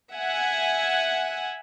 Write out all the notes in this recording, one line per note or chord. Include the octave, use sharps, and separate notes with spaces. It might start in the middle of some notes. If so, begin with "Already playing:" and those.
E5 F#5 G#5